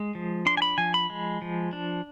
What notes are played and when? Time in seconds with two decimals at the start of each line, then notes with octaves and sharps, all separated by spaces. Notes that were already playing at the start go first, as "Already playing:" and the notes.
Already playing: G#3
0.15 F3
0.46 D4 C6
0.57 G#5
0.62 B5
0.78 F3 G#5
0.94 B5
1.10 G#3
1.42 F3
1.73 D4